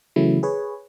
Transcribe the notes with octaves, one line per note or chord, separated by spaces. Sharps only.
C#3 E3 F#3 A3 C#4 E4
G#4 B4 C#5